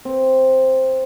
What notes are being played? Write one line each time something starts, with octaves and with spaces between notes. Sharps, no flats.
C4